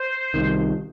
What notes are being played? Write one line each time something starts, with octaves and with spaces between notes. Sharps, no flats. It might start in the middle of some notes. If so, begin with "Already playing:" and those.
Already playing: C5
C2 C3 D#3